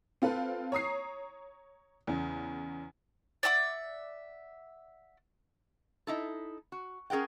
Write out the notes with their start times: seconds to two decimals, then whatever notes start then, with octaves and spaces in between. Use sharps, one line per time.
0.22 C4 F4 A4 B4
0.72 C#5 A#5 D#6 C7
2.07 E2 C#3
3.43 D5 E5 F#5 D6
6.07 D#4 E4 A4
6.72 F#4
7.10 C#4 G#4 A#4 F#5 G5